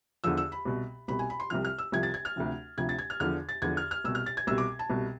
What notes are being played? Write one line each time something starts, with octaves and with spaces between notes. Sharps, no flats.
E2 D3 F3 E6
E6
B5
C2 B2
C2 B2 B5
G#5
B5
C6
C2 C3 F3 F6
F6
E6
C2 C3 F3 G#6
A6
G#6
F6
D2 C3 F3
D2 C3 F3 G#6
A6
G#6
F6
E2 D3 F3 F6
A6
E2 D3 F3 G#6
F6
F6
C2 B2 E6
F6
A6
G#6
C2 B2 E6
D6
A5
C2 B2